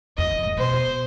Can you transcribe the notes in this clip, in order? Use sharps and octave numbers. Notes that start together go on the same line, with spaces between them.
E2 D#5
F2
A2
B2 C5